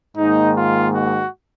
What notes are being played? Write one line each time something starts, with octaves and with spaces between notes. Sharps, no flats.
G#2 D#3 A#3 D#4
F4
F#4